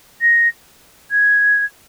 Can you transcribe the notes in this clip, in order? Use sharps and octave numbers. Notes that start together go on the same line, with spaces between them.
A#6
G#6